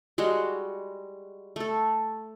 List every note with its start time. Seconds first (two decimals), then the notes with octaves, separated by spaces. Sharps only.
0.18 G3 G#3 F#4
1.56 A3 A4